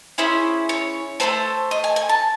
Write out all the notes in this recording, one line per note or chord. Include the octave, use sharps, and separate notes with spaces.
C#4 E4 G#4 C5
C#5
A3 D#4 A4 C5
D#5
G#5
G#5
A5